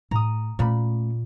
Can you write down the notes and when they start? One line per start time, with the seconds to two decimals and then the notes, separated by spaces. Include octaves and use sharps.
0.11 A2 A#5 D#6
0.59 A#2 A3 C#4 B5